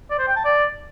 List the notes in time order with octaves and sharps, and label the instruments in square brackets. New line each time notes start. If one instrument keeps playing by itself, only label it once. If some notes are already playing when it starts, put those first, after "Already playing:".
[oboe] D5
C5
G5
A5
D5